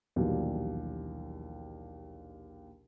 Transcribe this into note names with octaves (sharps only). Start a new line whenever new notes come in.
A#1 D#2 B2 E3 F#3 G3